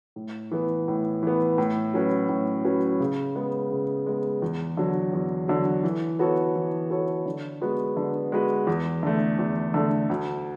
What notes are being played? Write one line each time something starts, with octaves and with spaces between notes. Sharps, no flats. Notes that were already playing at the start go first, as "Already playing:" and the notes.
A2
E3 B3
A2
E3 B3
A2
F#3 C#4 F#4 B4
A2
F#3 C#4 F#4 B4
C#3
G#3 B3
C#3
G#3 B3
E2
D3 F#3
E2
D3 F#3
E3
B3 F#4 A4 C#5
E3
B3 F#4 A4 C#5
D3
G#3 B3 F#4 B4
D3
G#3 B3 F#4 B4
E2
D3 A3
E2
D3 A3
D2